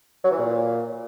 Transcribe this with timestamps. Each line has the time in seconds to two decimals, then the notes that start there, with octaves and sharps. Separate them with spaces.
0.24 F#3
0.31 E3
0.39 A#2